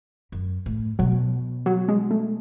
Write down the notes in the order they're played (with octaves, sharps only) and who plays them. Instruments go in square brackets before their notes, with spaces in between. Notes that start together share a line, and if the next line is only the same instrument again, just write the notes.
[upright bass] F#2
A2
[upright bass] B2 [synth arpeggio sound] F#3
[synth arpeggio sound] F#3
G#3
A3